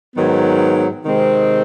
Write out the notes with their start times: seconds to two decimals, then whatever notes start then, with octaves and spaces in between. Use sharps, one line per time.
0.15 G#2 D#3 F#3 B3
1.04 C3 D#3 G#3 C4